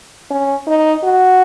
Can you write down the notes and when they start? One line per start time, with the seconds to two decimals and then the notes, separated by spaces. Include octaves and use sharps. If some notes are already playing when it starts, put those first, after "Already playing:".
0.31 C#4
0.67 D#4
1.04 F#4